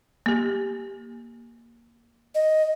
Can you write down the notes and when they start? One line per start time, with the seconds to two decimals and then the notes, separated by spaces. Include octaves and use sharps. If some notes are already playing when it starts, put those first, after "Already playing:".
0.26 A#3 G4
2.35 D#5